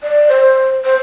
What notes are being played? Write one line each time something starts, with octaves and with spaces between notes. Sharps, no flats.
D5
C5
C5